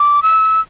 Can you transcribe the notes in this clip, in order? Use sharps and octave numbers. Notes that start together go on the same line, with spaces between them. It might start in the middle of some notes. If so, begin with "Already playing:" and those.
Already playing: D6
E6